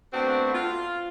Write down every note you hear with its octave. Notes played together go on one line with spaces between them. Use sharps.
A3 B3 C4 D4 F#4
F4